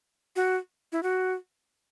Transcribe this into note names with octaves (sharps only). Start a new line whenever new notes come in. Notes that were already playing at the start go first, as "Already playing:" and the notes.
F#4
E4
F#4